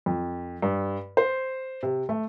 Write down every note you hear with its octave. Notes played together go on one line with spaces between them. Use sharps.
F2
G2
C5
C3
A3